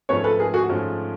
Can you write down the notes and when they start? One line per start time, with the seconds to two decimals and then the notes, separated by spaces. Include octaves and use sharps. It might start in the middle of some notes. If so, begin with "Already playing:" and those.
0.09 G#2 F3 A3 C#4 B4 C#5
0.24 A4 B4
0.39 G#4 A#4
0.54 F#4 G#4
0.69 G#2 F3 A3 C#4